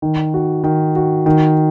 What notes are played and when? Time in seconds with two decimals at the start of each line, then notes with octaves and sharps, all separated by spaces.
0.02 D#3
0.34 F#4
0.64 D#3
0.96 F#4
1.26 D#3